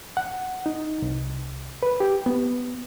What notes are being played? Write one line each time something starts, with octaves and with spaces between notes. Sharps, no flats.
F#5
D#4
C2
B4
G4
B3